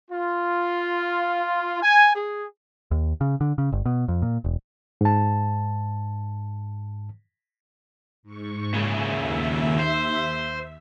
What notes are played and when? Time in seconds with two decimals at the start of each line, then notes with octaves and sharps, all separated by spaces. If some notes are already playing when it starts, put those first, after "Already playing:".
0.11 F4
1.83 G#5
2.15 G#4
2.91 D#2
3.21 C#3
3.41 D3
3.58 C#3
3.72 G1
3.85 B2
4.08 F2
4.22 A#2
4.44 E1
5.01 G#2 A5
8.23 G#2 C#6
8.74 A#2 C#3 E5 G#5
9.07 D#2 E5
9.79 C5